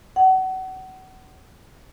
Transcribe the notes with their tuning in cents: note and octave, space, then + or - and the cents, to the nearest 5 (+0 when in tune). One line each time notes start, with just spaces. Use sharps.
F#5 +30